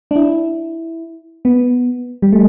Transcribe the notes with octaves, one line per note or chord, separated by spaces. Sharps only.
D4
E4
B3
G3
A3